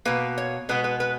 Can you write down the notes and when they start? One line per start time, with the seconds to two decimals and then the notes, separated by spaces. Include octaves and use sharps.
0.05 B2 A#3 B4
0.38 C#5
0.69 B2 G#3 B3 B4
0.84 B4
1.00 B4